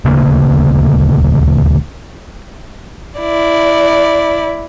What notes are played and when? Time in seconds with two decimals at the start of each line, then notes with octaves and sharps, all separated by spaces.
0.05 D#1 D2 C#3 A#3
3.20 E4 D5